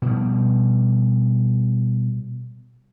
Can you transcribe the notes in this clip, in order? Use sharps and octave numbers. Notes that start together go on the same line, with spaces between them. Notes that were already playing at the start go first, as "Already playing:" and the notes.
B2 G3